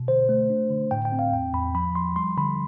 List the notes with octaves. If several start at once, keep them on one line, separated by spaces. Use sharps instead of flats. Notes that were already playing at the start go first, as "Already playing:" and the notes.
Already playing: B2
D3 C5
A3
D4
D3
A2 G5
G5
C4
F5
E2 G5
E2 B5
F3 B5
F3 C6
G3 C6
D3 B5